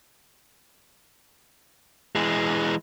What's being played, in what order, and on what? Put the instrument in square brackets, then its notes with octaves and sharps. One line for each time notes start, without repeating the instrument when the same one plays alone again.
[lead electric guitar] E3 G#3